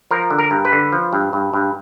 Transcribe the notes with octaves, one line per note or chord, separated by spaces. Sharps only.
F3 A#4
D3
A#4
G2
B4
D3
F3
G2
G2
G2